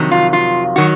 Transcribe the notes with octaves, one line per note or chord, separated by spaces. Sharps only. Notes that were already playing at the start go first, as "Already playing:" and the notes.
Already playing: F2 C3 D#3 F#3
F4
F4
D#3 F#3 F#4